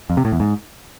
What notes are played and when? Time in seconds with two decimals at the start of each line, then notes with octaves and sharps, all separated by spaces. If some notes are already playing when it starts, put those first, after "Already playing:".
0.10 F2
0.17 C3
0.25 A2
0.32 E2
0.40 G#2